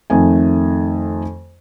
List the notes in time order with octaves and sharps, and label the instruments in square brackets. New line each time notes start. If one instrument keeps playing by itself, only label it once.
[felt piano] F2 D#3 A3 G#5